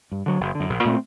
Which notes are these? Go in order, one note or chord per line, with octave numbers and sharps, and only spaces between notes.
G2
D3 F#3
F#1
D3
F#2
A#1
A#2 A3 C4